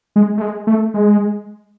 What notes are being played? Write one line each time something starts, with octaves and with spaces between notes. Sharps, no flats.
G#3
A3
G#3
A3
G#3